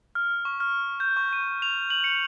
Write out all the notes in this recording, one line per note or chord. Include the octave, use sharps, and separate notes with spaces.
F6
C#6
F6
G6
C#6
D#7
F7
F#7
C#7